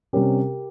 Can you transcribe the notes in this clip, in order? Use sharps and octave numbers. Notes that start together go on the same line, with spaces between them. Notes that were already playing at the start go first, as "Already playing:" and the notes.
C3 G3 C#4 G4 A#4